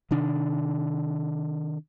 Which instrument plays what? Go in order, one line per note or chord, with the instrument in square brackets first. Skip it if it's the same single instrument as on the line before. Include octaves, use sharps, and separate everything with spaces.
[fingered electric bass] C3 D#3 D4